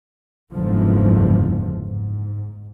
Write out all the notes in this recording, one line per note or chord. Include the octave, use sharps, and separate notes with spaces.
F#1 E2 G#2 D3 F3
G#2